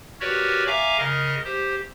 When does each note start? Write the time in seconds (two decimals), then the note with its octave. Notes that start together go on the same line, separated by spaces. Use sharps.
0.21 F#4 G4 A#4 B4 C#5 D5
0.67 E5 F5 G#5 A#5 D6
0.98 C#3 A#4 D#5
1.45 G4 C5